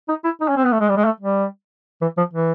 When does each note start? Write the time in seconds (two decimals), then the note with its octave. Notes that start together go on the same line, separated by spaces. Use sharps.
0.09 D#4
0.24 E4
0.41 D#4
0.49 C#4
0.57 C4
0.64 B3
0.72 A3
0.80 G#3
0.89 G3
0.97 G#3
1.05 A3
1.21 G3
2.02 E3
2.18 F3
2.33 E3